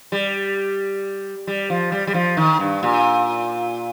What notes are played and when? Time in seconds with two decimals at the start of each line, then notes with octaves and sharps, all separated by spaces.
0.12 G3
1.47 G3
1.70 F3
1.92 G3
2.07 G3
2.14 F3
2.37 D#3
2.59 G2
2.83 A#2